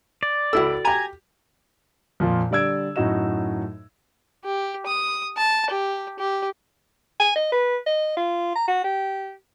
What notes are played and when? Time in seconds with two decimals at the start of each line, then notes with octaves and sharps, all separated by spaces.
0.23 D5
0.53 C#2 E4 F#4 A4 E6
0.85 G4 G#5 A#5 B5 G#6
2.20 F2 A#2 F3
2.51 D3 G3 D5 E6 G#6 D7
2.96 F#2 A2 D#4 F#4 D#5 E7
4.45 G4
4.86 D#6
5.37 A5
5.70 G4
6.19 G4
7.20 G#5
7.36 D#5
7.52 B4
7.86 D#5
8.17 F4
8.56 A#5
8.68 F#4
8.84 G4